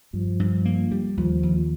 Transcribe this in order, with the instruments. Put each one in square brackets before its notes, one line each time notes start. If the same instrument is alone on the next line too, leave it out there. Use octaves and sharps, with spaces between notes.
[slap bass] G2 [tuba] F3
[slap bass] G2
A#3
G3
[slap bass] D#2 [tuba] F3
[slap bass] D#2